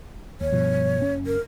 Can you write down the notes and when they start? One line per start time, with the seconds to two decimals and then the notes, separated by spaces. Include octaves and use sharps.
0.41 D#2 C#5
0.52 G2 B2 F3
1.02 F#1 C#4
1.26 A#4